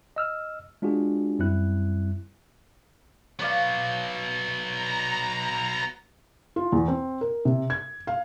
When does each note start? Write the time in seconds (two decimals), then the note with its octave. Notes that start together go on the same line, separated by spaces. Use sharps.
0.16 D#5 E6 F6
0.82 G#3 D4 F4 F#4 G#4
1.39 F#2 G3 C4 E4 F#6
3.39 F#3 B3 C#5 D5 F5
4.71 A#5
6.56 F4
6.72 E2
6.88 C4
7.21 A#4
7.45 C3
7.70 G#6
8.07 F5